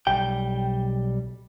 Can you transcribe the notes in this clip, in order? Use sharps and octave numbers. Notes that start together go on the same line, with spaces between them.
B1 G3 G5